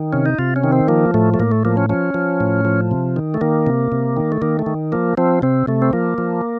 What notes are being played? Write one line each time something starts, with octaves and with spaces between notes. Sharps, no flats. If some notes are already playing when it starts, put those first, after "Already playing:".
Already playing: D#3
C3 C#4
D#4
C3 F4
C#4
D#3
C4
F3 A#3
A2 A3
A3
A2 A#3
A3
F3 A#3
C#4
F3 C#4
F3
A2
F3
C3
D#3
A3
D#3 A#3
C3
C3
D#3
A3
D#3 A#3
A3
D#3
F3 A#3
F3 C4
C3 C4
C3 A3
C4
F3 A#3
F3